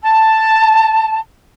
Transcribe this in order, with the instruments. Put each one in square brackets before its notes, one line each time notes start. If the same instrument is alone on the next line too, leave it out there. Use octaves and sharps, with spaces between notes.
[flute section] A5